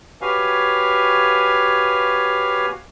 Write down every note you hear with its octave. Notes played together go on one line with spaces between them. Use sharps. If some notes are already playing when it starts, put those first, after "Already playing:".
F#4 G4 B4 C#5 F5 G#5